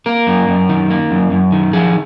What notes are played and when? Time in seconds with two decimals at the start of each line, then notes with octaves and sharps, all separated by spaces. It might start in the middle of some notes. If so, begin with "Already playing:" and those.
0.06 A#3 A#4
0.27 F#2
0.48 F#2
0.69 D#3
0.90 A#3
1.11 F#2
1.31 F#2
1.52 D#3
1.73 F3 G#4